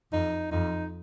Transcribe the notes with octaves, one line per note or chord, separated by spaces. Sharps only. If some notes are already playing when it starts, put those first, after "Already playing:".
F2 D#4
F2 D#4